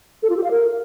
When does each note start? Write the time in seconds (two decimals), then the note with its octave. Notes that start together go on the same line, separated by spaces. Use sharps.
0.23 A4
0.30 F4
0.37 G4
0.44 F5
0.51 A#4